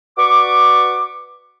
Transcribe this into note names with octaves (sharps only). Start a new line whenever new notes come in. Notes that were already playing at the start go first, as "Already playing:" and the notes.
F#4 B4 D5 C#6 D6